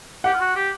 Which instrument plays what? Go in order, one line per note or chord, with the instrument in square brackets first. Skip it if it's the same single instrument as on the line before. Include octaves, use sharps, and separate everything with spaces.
[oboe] G4 [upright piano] F#5
[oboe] F4
F#4
G4